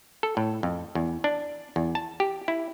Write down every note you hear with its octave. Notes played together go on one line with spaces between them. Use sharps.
A4
A2
F2
E2
D4
E2
A5
G4
E4